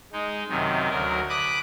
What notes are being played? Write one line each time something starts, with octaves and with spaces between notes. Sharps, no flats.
G#3 D#4
F#2 C3 D#3
D2 F#3 A#4
B5 D6 D#6 F#6